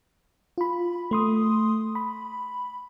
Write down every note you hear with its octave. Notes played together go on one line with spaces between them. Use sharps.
F4 B5
A3 C6 D#6
B5